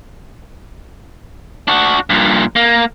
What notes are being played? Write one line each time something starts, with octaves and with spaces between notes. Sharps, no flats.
D4 F#4
G2 A#2
A#3